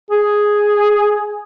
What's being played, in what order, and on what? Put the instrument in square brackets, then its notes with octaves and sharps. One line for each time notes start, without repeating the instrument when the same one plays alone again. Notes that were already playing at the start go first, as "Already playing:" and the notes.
[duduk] G#4